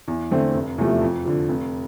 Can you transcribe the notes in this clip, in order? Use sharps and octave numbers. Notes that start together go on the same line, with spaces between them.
E2
D3 A3 C4
F1
E2 C3 F3 A3
F2
D3 F3
F1